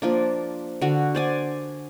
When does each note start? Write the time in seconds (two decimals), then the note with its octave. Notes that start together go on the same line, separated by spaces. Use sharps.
0.02 F3 A#3 D4
0.81 D3 F#4
1.15 C5 D5 G#5